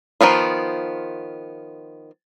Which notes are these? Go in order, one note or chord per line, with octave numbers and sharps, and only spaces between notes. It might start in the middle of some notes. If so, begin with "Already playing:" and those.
D#3 F3 B3 F4